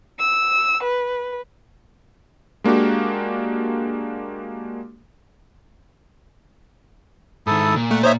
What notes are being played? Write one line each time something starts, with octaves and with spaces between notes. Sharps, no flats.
E6
B4
G#3 A#3 D4 F#4 G4
G#2 D#3 E4 A4 D#6
A#2
A3 F#5
D#4 C5 C#5 E5